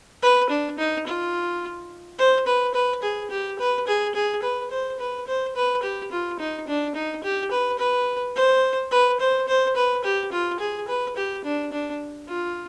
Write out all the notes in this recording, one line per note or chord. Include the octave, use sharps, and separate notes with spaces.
B4
D4
D#4
F4
C5
B4
B4
G#4
G4
B4
G#4
G#4
B4
C5
B4
C5
B4
G4
F4
D#4
D4
D#4
G4
B4
B4
C5
B4
C5
C5
B4
G4
F4
G#4
B4
G4
D4
D4
F4